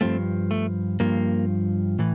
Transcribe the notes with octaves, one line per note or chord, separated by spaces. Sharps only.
G2 F3 A3 C4
A3
G2 F3 A#3
A2 E3